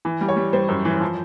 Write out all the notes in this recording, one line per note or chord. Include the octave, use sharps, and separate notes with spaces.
E3
G3
C#5
G3
G3 C5
F#2
E3
F3